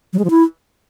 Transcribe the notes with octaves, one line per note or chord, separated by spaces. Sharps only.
F#3
G#3
F3
E4